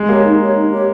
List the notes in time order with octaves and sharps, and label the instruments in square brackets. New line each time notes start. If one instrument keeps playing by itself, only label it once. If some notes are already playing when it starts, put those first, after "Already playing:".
Already playing: [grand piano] G#3
[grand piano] A#3 [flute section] G4 C#5
[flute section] D#4
G4 C#5
D#4
G4 C#5